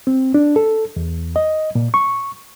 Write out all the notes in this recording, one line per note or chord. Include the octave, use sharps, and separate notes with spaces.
C4
D4
A4
E2
D#5
A#2
C#6